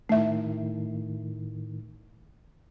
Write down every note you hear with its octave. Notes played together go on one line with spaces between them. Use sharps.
A2 D#3 A3 E5